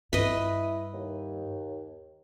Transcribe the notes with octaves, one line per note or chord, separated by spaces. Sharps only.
G2 E4 B4 D#5
D#2